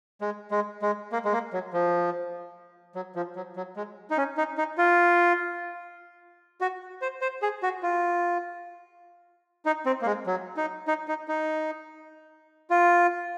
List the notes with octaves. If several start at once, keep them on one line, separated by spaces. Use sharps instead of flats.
G#3
G#3
G#3
A#3
G#3
A#3
F#3
F3
F#3
F3
F#3
F#3
G#3
D#4
C#4
D#4
D#4
F4
F#4
C5
C5
G#4
F#4
F4
D#4
C4
A#3
G#3
F#3
D#4
D#4
D#4
D#4
F4